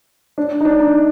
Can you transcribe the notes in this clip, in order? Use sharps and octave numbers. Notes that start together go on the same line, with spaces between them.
D4
D#4
D4
D#4